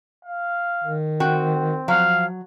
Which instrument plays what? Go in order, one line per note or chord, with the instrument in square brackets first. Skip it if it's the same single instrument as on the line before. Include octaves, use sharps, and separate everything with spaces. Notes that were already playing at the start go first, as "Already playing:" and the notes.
[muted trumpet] F5
[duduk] D#3
[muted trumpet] C4 [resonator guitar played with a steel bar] F#4 G5
[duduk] F3 [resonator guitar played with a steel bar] F#3 [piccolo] F5